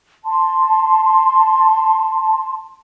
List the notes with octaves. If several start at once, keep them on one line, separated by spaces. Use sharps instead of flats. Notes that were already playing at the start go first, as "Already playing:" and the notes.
A5 C6